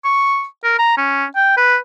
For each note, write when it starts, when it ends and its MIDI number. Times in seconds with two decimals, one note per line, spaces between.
0.05 0.45 85
0.64 0.74 70
0.79 0.96 82
0.98 1.25 61
1.36 1.55 79
1.57 1.76 71